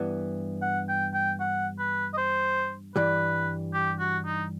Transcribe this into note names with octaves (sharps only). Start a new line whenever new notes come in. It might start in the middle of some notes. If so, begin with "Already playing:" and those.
Already playing: G2 E3 B3
F#5
G5
G5
F#5
B4
D#5
C5
G2 E3 G3 B4
G4
F#4
D#4